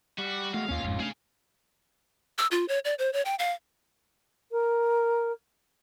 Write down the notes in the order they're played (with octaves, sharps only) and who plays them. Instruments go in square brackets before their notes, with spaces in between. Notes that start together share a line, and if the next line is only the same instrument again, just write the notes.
[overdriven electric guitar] G3 [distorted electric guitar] F#4
[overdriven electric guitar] G#3 F#4 [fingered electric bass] A3 [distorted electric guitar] F5
[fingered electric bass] D#2 A#3 [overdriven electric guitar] C#4 F4
[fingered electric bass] G#1 F2 G#2
[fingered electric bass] A3 C#4 D4 [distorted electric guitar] G#4 F5
[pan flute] E6
F4
C#5
D5
C5
C#5
G5
F5
[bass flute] A#4